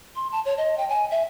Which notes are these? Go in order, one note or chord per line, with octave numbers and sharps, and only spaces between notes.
C6
A5
C#5
D#5
G5
G#5
E5